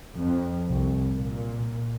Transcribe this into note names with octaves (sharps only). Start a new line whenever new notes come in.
F2
C2
A#2